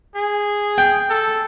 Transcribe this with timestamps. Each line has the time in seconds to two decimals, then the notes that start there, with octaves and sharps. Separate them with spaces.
0.16 G#4
0.78 G5
1.10 A4